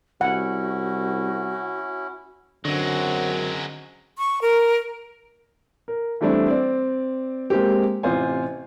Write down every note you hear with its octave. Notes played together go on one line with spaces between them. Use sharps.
C2 C#4 E4 F#4 F#5
F#2 D3 F#3 G#3 C4 F#4
C#6
A#4
A#4
E3 G3 A3 C4 D4 E4
C4 D5
G#3 A#3 C4 G4
A1 C3 F4 C5 G#5